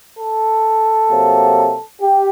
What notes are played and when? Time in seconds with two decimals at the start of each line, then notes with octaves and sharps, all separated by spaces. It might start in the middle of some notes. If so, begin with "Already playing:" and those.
0.17 A4
1.09 C3 F#3 A#3
2.01 G4